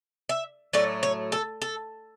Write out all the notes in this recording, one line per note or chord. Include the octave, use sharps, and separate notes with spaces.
E5
A2 F#3 A3 D5
C#5
A4
A4